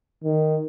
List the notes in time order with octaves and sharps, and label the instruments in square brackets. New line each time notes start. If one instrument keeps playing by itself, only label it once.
[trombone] D#3